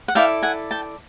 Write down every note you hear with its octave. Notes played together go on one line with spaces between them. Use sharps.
F#5
E4 A4 D5 F5 G5
F#5 G#5
G5 A5